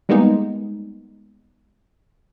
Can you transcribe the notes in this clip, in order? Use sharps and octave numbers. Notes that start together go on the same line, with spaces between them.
G3 G#3 A#3 B3 D#4